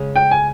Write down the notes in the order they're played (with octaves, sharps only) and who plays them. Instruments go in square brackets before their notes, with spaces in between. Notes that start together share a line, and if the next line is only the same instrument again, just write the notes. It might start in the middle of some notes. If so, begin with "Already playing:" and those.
Already playing: [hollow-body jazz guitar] C#3 G#3 C#4 G#4
[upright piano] G5
G#5